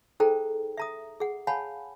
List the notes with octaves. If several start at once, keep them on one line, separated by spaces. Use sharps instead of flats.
D#4 G#4 A4 C5 G5 A#5
E5 A#5 D#6
G#4 F#5
C#5 F5 F#5 G#5 A5 B5